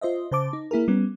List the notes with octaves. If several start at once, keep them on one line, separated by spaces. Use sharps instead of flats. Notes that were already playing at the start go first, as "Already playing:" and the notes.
F4 C5 D#5 E5
C#3 C5 A5 D6
D#4
A#3 E4 G#4 A#4
G3 B3 C#4